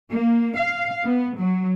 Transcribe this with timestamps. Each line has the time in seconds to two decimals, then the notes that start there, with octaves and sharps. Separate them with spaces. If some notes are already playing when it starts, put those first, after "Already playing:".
0.11 A#3
0.58 F5
1.05 B3
1.38 F#3